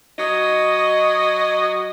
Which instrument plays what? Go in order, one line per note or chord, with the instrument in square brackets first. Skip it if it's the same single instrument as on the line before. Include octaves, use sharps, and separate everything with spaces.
[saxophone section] F#3 D#5